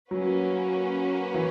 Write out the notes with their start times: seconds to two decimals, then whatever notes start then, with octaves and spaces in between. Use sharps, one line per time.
0.10 F#3 A#3 C#4 F#4 B4
1.34 E3